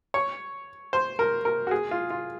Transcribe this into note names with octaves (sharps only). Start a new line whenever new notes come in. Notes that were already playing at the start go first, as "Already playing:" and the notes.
C#5
C5
A#4
A#4
F#4
G#4
F4
F4